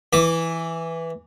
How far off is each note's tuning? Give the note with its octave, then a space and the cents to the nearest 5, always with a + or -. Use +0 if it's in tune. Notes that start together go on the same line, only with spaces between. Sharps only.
E3 +0 D6 +0